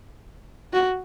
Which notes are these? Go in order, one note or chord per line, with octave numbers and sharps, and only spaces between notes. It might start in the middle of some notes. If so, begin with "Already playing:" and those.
F#4